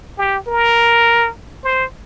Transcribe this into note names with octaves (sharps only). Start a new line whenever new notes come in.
G4
A#4
C5